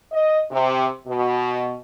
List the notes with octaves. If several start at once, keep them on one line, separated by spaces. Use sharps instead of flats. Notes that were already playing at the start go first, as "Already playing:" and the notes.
D#5
C3
B2